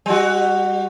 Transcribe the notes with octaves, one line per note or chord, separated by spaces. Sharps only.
G3 F#4